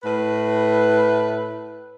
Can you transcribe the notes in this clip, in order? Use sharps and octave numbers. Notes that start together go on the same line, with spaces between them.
A2 B4